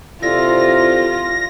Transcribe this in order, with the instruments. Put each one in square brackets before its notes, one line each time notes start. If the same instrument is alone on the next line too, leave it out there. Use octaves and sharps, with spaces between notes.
[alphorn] C3 [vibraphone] E4 A4 D5 [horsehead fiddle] F4 [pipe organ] A#6